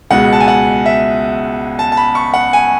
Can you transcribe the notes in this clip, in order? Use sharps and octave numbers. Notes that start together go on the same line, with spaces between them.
C#2 B2 G#3 F#5
A5
G#5
F#5
E5
A5
A5
B5
C#6
F#5
G#5